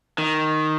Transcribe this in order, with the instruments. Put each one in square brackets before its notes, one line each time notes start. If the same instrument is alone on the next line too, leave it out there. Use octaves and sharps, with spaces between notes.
[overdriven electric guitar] D#3